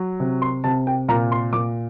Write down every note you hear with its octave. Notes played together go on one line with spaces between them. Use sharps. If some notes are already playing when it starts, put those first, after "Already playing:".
Already playing: F#3
C3
C6
C3 A5
G5
A#2 A#5
C6
A#2 D6